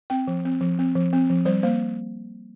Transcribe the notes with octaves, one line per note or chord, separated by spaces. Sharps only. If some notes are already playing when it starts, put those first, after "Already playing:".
C4 G5
F3
C4
F3
C4
F3
C4
F3
G3 C5
A#3 C5